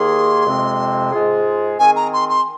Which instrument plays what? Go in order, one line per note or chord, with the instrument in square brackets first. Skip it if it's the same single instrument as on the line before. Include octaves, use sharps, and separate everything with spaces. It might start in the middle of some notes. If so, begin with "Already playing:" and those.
Already playing: [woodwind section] D#2 D#3 A#3 G#4 [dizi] C6
[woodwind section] F2 C3 G#3 C4
G#2 G#3 F4 G#4
[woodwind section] D#3 C4 G#4 [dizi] G#5
[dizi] A#5
C6
C6